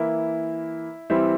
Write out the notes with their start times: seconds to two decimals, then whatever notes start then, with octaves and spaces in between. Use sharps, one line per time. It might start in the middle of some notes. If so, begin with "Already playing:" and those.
Already playing: E3 A#3 E4
1.10 E3 G3 C4 E4